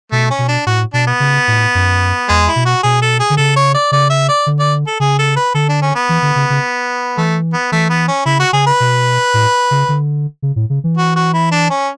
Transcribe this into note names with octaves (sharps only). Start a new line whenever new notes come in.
B2 A3
C#4
B2
D4
A2 F#4
B2 D4
B3
C#3
A2
F#2
E2 G#3
E4
B2
F#4
B2 G#4
A4
G#4
D3
C#3 A4
C#5
D5
C#3 D5
E5
D5
D3
D5
A4
C#3 G#4
A4
B4
D3 A4
D4
C#4
B3
E3
D3
C#3
C#3
E3 A3
B3
E3 A3
B3
C#4
C#3 E4
F#4
C#3 G#4
B4
B2
A2
C#3
D3
C#3
A2
C#3
E3
F#4
F#4
E4
D4
C#4